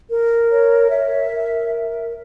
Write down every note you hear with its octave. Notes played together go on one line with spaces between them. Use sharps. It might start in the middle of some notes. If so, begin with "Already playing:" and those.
A#4
C#5
E5
A#4